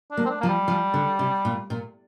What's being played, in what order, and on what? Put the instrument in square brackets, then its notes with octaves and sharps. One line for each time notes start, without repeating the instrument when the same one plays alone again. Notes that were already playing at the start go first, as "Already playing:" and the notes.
[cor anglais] D4
[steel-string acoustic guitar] A#3
[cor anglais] C4
D4
[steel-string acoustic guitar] F3 [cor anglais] A#3
[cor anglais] G3
[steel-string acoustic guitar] F3
D3
C3
A#2
A#2